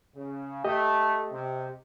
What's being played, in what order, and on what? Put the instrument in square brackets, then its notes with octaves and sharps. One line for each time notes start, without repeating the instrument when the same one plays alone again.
[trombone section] C#3
[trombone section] A3 [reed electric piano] G4 D#5
[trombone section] C3